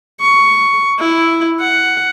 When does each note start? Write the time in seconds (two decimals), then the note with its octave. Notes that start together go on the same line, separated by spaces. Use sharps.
0.21 C#6
1.00 E4
1.60 F#5